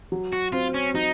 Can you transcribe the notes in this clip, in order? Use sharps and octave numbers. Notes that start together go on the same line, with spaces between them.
F#3
F#4
C4 F4
C#4
F#3 D#4